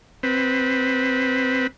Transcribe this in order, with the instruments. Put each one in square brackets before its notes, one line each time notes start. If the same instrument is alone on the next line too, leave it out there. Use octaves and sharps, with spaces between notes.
[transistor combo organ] C4 B4